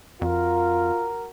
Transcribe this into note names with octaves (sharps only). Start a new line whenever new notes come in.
F2 F4 F#4 A#4